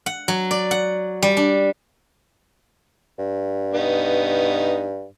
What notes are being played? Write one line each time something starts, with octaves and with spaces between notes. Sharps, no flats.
F#5
F#3
D5
F#5
G3
D4
G2
B3 D#4